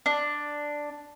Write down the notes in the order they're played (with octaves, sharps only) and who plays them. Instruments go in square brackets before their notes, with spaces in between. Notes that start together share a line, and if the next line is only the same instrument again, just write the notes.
[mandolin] D4